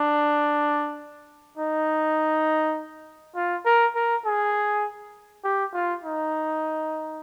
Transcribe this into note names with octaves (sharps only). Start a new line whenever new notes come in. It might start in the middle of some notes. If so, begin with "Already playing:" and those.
Already playing: D4
D#4
F4
A#4
A#4
G#4
G4
F4
D#4